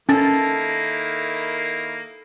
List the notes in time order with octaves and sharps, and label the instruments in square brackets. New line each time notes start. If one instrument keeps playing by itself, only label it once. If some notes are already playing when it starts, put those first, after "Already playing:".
[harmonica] D#3 A#3 E4 [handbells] C#4 A6 [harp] A4